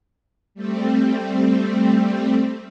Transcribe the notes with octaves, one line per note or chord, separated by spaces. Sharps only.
G3 A3 C4